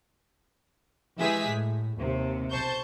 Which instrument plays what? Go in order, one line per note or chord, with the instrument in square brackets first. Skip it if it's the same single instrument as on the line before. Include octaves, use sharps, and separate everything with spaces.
[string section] E3 G#3 G4 G#4 E5 B6
A2
D#2 C3
B1 C5 A5 C#6 G6